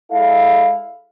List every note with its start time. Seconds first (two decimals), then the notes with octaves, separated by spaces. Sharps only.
0.12 G#3 E4 A4 F5